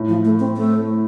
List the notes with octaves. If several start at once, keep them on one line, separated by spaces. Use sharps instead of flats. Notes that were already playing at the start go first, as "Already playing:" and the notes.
Already playing: A2
F3
A3
C4
A3